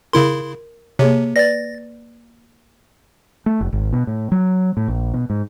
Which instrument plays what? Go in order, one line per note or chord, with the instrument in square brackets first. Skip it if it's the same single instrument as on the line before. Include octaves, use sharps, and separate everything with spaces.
[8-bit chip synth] C#3 E4 C6 [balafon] A#4
[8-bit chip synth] C3 [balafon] A#3 G#4 C#5
[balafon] B4 D5 [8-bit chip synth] A6 A#6
[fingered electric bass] A3
F1
G#1
B2
A2
F#3
A2
A#1
B2
G#2